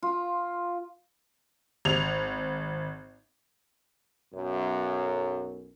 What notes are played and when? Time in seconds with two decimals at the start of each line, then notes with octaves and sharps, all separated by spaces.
0.03 F4
1.85 G#1 F7
4.34 B1 F#2